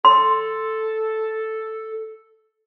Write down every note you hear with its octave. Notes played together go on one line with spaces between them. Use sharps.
A4 C6